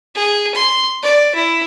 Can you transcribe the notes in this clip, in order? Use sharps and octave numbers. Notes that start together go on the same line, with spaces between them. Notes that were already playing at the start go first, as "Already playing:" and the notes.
G#4
C6
D5
E4